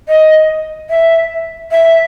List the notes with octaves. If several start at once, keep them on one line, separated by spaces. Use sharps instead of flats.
D#5
E5
E5